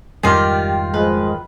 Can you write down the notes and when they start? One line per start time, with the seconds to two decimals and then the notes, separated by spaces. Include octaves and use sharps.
0.23 F2 G#2 D#3 G3 F4 G4 G#4
0.94 F3 G#3 B4